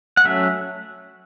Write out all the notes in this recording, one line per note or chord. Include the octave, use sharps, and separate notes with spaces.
F#5
F#3 A3 C#4 E5